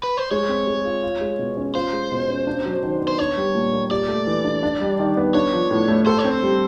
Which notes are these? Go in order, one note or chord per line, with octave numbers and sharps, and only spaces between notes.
B4
C5
G#3 C#5
C4
G#3
F4
F4
G#3
B2
C#4
F4 C5
G#3
B2
C#4
D4
F#3
D#3
B3
C5
D4 C#5
G3
A#2
A#3
G4 D5
A3
E3
D4
D4
G3
D#3
B3
D4 C#5
F3
A2
A3
A4 C5
C#5
C4
C5
G3